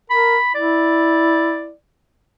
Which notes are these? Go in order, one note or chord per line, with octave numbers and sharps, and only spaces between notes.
A#4 B5
E4 D5